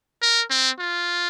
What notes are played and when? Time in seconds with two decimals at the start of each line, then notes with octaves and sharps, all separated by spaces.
0.22 A#4
0.50 C4
0.79 F4